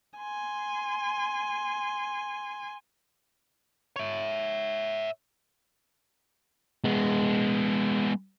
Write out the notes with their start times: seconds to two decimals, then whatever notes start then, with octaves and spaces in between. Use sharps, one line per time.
0.18 G#5 C6
3.96 C#5 E5
6.84 G#3 B3